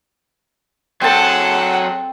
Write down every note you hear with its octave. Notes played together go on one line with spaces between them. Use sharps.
F#3 C4 G#4 A4 F#5 A5